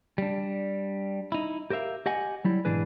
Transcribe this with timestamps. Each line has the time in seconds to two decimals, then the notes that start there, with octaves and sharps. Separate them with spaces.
0.18 G3 D4
1.32 D#4 E4
1.70 G4 A#4 C5 E5 F5
2.06 G4 D#5 F#5 G#5
2.45 F#3 G3 E4
2.65 B1 G#2 E3 D4 G#4 B4